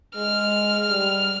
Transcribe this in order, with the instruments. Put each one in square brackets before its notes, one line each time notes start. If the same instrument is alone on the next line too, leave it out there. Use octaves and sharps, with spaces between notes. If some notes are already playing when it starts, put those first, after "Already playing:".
[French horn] G#3 [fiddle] F6
[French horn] G3